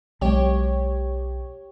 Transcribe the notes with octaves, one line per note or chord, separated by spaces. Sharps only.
B1 F#3 G#3 G4 C#5